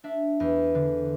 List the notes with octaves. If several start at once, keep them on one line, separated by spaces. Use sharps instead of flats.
D4 E5
E2
D3